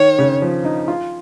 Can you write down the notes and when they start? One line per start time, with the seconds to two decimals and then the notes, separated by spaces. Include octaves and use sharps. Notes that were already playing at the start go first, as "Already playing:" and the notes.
Already playing: D#3 C#5
0.19 C#3
0.42 F3
0.65 D#4
0.88 F4